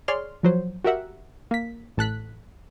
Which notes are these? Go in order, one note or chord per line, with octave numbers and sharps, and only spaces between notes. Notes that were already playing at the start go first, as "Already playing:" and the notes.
G#4 C#5 D5 C6 F6
F3 F#3 C5
F#4 G4 A#4 E5 F#5
A#3 B6
A1 A4 F#6 B6